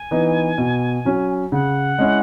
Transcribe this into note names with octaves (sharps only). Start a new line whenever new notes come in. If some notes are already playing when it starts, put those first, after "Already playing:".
Already playing: G#5
E3 B3 D#4
B2
F#3 C#4
C#3 F#5
G#3 C#4 E4